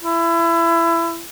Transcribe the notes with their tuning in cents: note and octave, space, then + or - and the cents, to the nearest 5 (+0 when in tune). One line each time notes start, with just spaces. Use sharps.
E4 +25